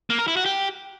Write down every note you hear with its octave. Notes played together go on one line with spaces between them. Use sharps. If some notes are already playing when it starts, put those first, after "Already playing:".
A#3
A#4
E4
F#4
G4